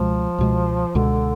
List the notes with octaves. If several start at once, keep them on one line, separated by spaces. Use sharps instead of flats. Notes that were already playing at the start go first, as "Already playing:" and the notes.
Already playing: C#2 B2 F3 G#3
C#2 B2 G#3
C#2 B2 D3 G#3